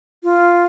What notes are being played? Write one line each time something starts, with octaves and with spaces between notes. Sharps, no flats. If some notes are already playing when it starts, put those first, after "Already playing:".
F4